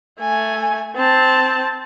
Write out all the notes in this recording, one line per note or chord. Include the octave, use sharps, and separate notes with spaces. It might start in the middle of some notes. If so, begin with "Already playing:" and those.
A3 G#5
C4 A5